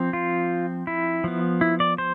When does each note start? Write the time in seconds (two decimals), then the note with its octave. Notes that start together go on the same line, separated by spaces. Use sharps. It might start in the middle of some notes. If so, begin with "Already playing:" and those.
Already playing: F3 C4
0.13 F4
0.87 E4
1.24 F3 B3
1.61 E4
1.80 D5
1.98 C5